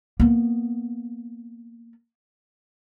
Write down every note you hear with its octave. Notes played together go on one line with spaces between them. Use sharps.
A#3 B3